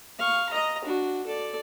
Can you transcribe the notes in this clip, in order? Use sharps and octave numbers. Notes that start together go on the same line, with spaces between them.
F5 C#6
D#5 A#5
D4 F#4
A4 D5